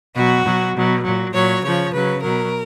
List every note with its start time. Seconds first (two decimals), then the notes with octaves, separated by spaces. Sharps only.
0.15 B2 F#3 F#4
0.45 B2 F#3
0.75 B2 F#3
1.04 A#2 F#3
1.33 A#2 F#3 C#5
1.63 C#3 F3 C#5
1.92 C#3 F#3 B4
2.22 B2 F#3 A#4